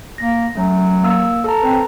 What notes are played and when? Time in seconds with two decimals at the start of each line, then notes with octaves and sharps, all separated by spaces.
0.18 A#3 A#6
0.55 F#3 A3 C#4
1.03 A#3 E6
1.44 A4 A5 A#5
1.63 C4 B4